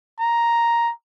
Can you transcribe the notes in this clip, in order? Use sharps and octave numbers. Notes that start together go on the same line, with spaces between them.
A#5